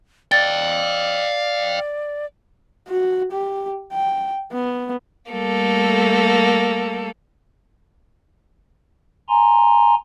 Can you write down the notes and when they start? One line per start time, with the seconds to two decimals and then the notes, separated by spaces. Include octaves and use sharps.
0.32 D5 F5 G5 A6
2.88 F#4
3.32 G4
3.93 G5
4.52 B3
5.30 G3 A3 A#3 A4
9.29 G#5 A#5 C6